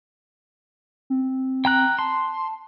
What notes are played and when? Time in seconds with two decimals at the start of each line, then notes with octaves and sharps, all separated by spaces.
1.10 C4
1.65 G5 A#5 F#6
1.99 A5 C6